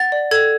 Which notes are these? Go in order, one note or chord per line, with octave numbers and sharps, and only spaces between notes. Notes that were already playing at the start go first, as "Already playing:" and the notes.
Already playing: F#5 A6
D5
A4 G#6